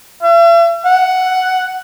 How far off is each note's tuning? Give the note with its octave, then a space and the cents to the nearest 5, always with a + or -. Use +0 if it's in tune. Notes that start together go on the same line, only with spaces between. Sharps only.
E5 +45
F#5 +5